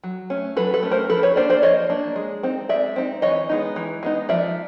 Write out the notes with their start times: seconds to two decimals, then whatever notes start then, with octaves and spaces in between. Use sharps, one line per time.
0.04 F#3
0.30 A3 C#4
0.57 F#3 A4 B4
0.74 A4 B4
0.83 A3 C#4
0.91 A#4 C5
1.09 F3 A4 B4
1.23 B4 C#5
1.36 A#3 D4 C5 D5
1.50 C5 D5
1.63 F3 C#5 D#5
1.90 A#3 D4
2.16 G#3
2.43 C4 D#4
2.69 G#3 D5 E5
2.96 C4 D#4
3.22 E3 C#5 D#5
3.49 G#3 B3 D#4
3.76 E3
4.03 G#3 B3 D#4
4.29 F3 D5 E5